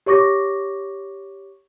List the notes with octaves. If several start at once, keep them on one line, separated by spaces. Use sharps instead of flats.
G4 C#5 C#6 D6 A#6